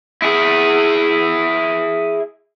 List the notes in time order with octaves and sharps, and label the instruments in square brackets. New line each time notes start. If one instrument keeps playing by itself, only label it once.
[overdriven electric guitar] E4 G#4